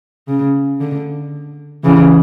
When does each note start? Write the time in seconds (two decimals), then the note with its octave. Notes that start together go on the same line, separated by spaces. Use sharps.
0.28 C#3
0.80 D3
1.84 C#3 E3